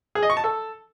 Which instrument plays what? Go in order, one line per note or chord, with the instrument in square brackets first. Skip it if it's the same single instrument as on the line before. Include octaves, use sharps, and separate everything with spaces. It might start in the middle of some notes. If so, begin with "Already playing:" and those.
[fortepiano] G#4
D#5
C#6
A5
A4